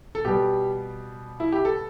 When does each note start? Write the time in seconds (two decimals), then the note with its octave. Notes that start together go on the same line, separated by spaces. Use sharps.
0.15 A4
0.25 B2 G3 B3 G4
1.40 E4
1.52 G4
1.65 A4